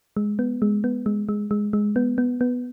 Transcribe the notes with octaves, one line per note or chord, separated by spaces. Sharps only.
G#3
B3
G#3
B3
G#3
G#3
G#3
G#3
B3
B3
B3